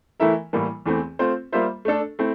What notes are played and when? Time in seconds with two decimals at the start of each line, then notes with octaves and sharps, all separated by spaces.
0.20 E3 A3 E4 A#4 E5
0.53 A2 E3 G3 A#3
0.86 E2 E3 A3 C4
1.19 A3 C4 F4 C5
1.52 G3 A#3 F4 C5 E5
1.85 A3 D4 A4
2.19 A3 C4 E4